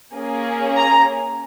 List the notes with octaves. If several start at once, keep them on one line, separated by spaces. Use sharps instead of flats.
A#3 C#4 G#4
A#5